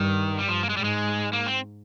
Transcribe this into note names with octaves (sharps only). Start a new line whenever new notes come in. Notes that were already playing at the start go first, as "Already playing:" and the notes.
Already playing: G2 D#3
G3
G2 F3
A#3
G#3
G#2 G3
G#3
A#3
C4